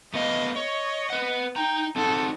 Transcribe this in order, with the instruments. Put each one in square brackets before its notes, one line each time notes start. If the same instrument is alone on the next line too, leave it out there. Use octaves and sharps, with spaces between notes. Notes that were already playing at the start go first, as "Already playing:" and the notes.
[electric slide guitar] A3 B3 F5 [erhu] D#5
[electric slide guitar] C#5 [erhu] D#5
[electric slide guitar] B4 F#5
[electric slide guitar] D#4 A#5 [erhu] G5
[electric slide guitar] C4 D#4 F#5 [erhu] A4